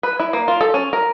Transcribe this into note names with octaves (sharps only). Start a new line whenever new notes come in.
B4
E4
A#3
F4
A4
C#4
A#4